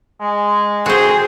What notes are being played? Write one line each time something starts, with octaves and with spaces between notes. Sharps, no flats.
G#3
C4 F#4 G#4 C5